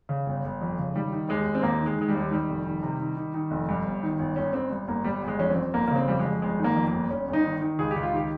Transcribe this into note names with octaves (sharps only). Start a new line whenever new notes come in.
C#3
G1
G1
F2
C#3
D#3 G3
D#3
D#2 G#3
D#2
C4
D#2 A#3
D#3
G#3
D#3 G#3
G3
D#2
D#3 G3
F1
D#3
C3
D#3
D#3
D#3
F1
G2
G1
D#3
G1
G1 C#4
G1 C4
G2
G1 A#3
G1 G3
G1
G#3
F2 C#4
C4
F2
G1 A#3
A#3
C#3 C4
F2 G3
G#3
F2
G1 G#3
D#3
A#3
F2
A#3
G1
G1 C#4
G1
D#4
D#3
D#3
C#2 G#4
G4
C#2
F4
D#3 G4